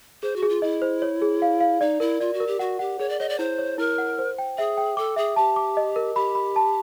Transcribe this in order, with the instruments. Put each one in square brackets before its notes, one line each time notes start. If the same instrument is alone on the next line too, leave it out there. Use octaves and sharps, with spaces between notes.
[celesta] G#4 [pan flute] C5
[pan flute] F#4
[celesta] G#4
[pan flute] F4
[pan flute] E4 [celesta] D#5
[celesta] C5
C#5
G#4
F5
F5
[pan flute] D#4 [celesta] D5
[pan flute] E4 [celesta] A#4
[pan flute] F4 [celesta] D5
[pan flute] F#4
[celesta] A#4
[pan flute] G4
[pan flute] F#4 [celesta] F#5
[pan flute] G4 [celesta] F#5
[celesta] G#4 [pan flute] C#5
[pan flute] D5
[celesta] C#5 [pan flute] D#5
[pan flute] D5
[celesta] E4 [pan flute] C5
[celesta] C#5
[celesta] E4 [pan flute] A#4
[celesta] F#5
C5
G5
[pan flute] G#4 [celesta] E5
[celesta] G5
[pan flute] A4 [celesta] D6
[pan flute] G#4 [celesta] E5
[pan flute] G4 [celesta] A5
[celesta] D6
D#5
A#4
[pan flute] G4 [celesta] B5
[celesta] B5
A5